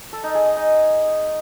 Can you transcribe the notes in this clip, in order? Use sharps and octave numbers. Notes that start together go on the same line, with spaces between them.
A4
D#4
G#4
D#5
D#4